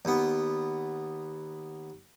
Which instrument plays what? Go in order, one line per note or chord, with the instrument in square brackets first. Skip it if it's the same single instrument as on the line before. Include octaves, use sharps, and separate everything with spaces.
[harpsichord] D#2 B3